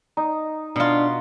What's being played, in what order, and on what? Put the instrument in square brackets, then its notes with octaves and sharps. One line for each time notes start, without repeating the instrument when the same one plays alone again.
[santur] D#4
[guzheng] B2 F4 [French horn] D4